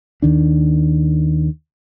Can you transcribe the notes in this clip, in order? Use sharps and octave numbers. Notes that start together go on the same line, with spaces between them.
D#2 D#3 D4